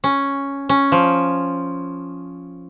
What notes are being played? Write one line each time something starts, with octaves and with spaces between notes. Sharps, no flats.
C#4
C#4
F3